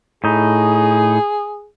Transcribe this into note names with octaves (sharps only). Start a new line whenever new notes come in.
A2 D#4 G#4